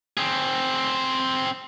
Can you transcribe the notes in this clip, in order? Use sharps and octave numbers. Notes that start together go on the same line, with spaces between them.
C4 G#4